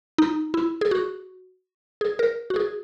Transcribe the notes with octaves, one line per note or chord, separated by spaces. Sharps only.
D#4
E4
G#4
F#4
G#4
A#4
F#4
G#4